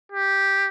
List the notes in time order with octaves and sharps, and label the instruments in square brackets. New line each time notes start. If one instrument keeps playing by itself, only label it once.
[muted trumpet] G4